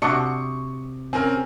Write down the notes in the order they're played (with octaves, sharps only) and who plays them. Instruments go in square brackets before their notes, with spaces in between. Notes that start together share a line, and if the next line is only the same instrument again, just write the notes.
[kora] C3 [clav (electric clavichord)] D4 F#4 [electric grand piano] C#6 D#6 C#7
[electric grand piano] C4 C#4 A#4 [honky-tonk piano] G#5 F6